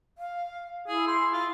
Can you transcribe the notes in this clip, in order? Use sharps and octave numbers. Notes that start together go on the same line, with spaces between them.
F5
E4 G#4
C6
F4